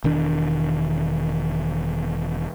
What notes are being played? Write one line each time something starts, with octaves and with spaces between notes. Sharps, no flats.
E1 D#3 D4